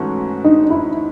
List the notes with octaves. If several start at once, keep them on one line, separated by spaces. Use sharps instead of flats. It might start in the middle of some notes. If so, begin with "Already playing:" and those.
Already playing: G#2 E3 A3 C#4 F#4
D#4
E4